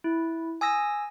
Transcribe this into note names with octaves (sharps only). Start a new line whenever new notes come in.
E4
G#5 D#6 E6 A#6